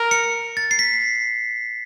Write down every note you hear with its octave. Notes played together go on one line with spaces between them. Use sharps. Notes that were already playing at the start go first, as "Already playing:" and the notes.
Already playing: A#4
C#7
A6
C7
B6